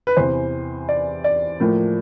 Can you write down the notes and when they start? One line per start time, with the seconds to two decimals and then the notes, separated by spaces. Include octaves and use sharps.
0.07 B4
0.17 E2 C3 E3 C5
0.89 D5
1.24 D5
1.60 A2 F3 A#3